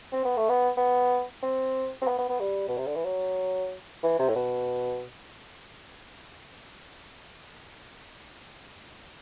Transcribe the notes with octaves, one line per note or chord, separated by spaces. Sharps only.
C4
B3
A3
B3
B3
C4
C4
B3
B3
B3
G3
B2
C3
D3
E3
F#3
E3
C3
A2
B2